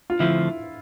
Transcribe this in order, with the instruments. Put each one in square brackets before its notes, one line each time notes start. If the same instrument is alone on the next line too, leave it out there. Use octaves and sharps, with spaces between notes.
[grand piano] F4
[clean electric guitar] D3 F3 A3 C4 [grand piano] E4